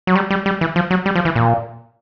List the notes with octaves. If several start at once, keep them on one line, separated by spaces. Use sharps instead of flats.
F#3
G3
G3
G3
E3
F3
F#3
G3
F3
E3
A#2